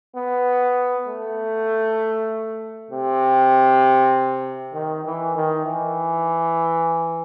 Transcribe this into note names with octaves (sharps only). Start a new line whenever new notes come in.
B3
A3
C3
D#3
E3
D#3
E3